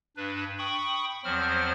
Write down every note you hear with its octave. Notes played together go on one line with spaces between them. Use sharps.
G2 D4 B4
G5 B5 C#6 D#6
E2 F3 F#3 C4 C5 F6